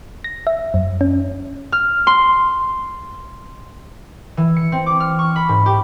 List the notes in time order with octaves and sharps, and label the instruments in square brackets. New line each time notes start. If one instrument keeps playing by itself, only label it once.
[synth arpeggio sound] A#6
E5
F#2
C#4
[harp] F6
C6
E3
C#7
C4
D6
F6
C#6
B5
G#2
G4